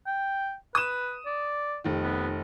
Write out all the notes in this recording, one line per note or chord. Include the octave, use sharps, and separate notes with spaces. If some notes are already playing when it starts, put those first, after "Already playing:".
G5
B4 D#6 E7
D5
F1 D#3
B3